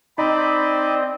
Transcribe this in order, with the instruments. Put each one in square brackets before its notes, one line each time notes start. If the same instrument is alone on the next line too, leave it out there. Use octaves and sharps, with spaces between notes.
[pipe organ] C4 D#5 [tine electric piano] D#4 [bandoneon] D5 [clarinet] B5